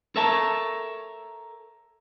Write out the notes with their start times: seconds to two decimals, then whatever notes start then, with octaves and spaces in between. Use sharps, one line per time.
0.16 A4 A#4 C#5 E5 A5